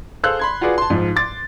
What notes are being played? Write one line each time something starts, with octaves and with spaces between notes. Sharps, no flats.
G#4 A4 C5 F5 E6 F#6
B5 C6 G#6
F4 F#4 G#4 B4 D5
A5 C6
G#2 F3 F4
C6 D6 A6